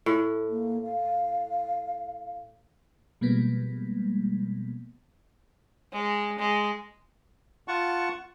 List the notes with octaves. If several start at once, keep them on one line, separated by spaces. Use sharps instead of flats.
A2
A#3
F5
B2 F3 G3 G#3 A#3 B3
G#3
G#3
F4 F#5 A5 C#6